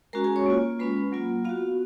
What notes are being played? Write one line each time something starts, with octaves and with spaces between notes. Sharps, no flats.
G#3 C#4 F#4 A#4 A#5
G#4 G#5
C#5 C#6
A#3 F4
G#3 C#4 F4 B4 B5
F#3 A#3 F4
B3 F4 F#4 F5